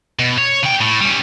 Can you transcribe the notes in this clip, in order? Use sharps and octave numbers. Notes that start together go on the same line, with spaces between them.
B2
C#5
C#3 G5
A2
G3 C#4